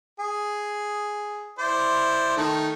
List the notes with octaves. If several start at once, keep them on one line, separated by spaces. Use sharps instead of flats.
G#4
E4 C5 D5
D#3 A3